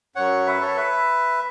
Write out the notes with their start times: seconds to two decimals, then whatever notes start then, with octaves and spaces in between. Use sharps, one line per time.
0.16 F#2 F#3 C#5 F#5
0.46 B4 E5
0.61 A4 C#5
0.76 B4 E5